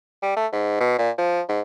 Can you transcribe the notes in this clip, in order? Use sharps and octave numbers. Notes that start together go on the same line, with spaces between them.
G3
A3
G#2
B2
A#2
F3
G#2